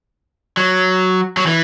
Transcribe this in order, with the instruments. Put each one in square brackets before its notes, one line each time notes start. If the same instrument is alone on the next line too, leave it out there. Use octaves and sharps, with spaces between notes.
[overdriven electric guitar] F#3
F#3
E3